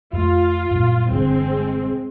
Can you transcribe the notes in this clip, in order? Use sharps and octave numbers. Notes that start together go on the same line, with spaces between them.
F2 A3 F4
F#2 A#2 G3
E1 G2 D3 G#3 C4